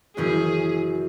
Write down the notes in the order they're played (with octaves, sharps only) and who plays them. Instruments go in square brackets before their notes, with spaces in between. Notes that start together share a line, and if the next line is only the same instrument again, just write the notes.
[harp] F#1 F#2 E3 C#4 [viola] G#4